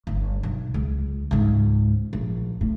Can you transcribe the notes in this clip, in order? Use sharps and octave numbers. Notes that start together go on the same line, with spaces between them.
G1
B1
C#2
C#2 G#2
A#1
A2